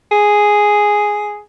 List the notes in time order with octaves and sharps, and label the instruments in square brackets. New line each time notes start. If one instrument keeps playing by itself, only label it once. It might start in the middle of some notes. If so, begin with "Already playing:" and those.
[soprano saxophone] G#4